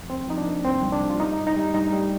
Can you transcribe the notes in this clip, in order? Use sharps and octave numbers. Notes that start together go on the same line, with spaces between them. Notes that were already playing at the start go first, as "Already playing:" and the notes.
Already playing: F2
C2 C4
F3 D#4
D4
A#3
C2 C4
C2
D4
C3
F4
G3 D#4
G2
D#4
G3
G2 D#4
G3